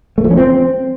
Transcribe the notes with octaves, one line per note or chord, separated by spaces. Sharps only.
A3
F3
C#4
C4